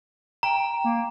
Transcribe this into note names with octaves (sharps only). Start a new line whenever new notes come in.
G5 A#5
A#3